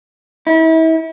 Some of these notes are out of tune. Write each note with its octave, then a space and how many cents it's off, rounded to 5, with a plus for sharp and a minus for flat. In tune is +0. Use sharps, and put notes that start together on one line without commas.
E4 -35